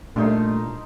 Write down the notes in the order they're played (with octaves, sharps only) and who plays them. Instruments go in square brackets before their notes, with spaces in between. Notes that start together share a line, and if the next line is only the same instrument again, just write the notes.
[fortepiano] G2 [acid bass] A#2 [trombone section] A3 [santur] D#4 C6